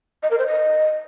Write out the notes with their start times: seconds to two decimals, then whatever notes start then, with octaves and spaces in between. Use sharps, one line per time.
0.23 D#5
0.31 A#4
0.39 C5
0.47 D#5